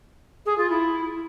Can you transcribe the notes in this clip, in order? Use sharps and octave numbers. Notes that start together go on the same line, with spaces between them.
G#4
F4
E4